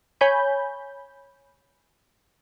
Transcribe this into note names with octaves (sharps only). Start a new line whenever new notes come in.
C#5 G#5 B5 G6